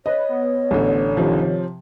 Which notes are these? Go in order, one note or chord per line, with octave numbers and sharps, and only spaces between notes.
B4 C#5 D#5
B3
A1 D3
C3 D#3 F3